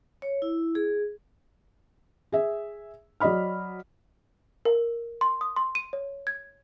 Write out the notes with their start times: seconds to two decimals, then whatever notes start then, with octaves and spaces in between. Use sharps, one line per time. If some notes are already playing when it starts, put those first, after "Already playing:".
0.22 C#5
0.42 E4
0.75 G#4
2.32 G#4 E5
3.20 F#3 D5 D#5 B5 F6
4.65 A#4
5.21 C6
5.41 D#6
5.56 C6
5.75 D#7
5.93 C#5
6.27 G#6